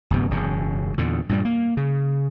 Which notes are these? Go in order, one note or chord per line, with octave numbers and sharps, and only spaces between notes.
D1 F#2 C3 B3
E1 F#2 C#3
E2 A#2 D3
G2 A#2 G3
A#3
C#3